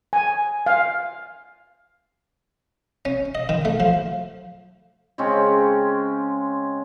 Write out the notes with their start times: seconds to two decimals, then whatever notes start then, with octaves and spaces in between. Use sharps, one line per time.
0.13 G#5
0.66 F5
3.05 C#4
3.35 D#5
3.49 D#3
3.65 A3
3.80 F3
5.18 C#3 G#3 C4 C#4